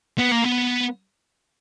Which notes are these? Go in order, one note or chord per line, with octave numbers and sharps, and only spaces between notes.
B3
A#3
B3